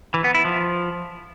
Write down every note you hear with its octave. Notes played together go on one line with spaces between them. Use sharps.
E3
B3
E4
F3